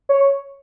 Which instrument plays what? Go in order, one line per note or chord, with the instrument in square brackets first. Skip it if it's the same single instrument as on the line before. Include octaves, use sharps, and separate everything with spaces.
[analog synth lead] C#5